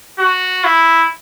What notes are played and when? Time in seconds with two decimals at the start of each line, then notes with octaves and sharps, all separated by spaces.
0.19 F#4
0.65 E4